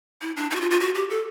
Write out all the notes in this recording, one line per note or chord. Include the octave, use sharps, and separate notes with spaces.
E4
D4
D#4
F#4
F4
F4
F#4
G4
A4